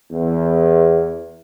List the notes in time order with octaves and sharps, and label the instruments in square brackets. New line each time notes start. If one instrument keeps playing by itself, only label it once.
[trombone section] E2